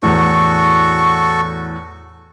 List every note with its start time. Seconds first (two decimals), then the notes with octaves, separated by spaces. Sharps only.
0.03 E2 A2 F#4 A4 C#6